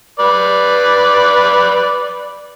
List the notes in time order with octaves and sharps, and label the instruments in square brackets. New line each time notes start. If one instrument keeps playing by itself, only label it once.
[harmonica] B4 D5